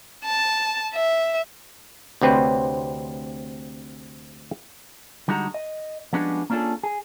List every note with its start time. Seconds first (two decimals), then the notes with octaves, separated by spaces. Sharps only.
0.25 A5
0.94 E5
2.21 D2 C3 C4 B4 C#5
5.28 D3 G3 G#3 D#4 F#4 A#5
5.54 D#5
6.13 F3 G3 G#3 B3 C#4 D4
6.50 A#3 C#4 D4 F4 G#4 A4
6.83 G#4